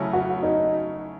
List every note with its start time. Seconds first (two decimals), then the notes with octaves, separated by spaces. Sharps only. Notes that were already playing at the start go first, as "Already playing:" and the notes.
Already playing: C#3 F#3 A3 C#4 E4
0.13 F#4
0.43 D#4